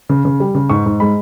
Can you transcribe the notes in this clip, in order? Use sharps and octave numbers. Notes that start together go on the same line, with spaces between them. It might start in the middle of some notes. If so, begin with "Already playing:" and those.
C#3
C#3
G3
C#3
G#2 C#6
G#2
G#3 B5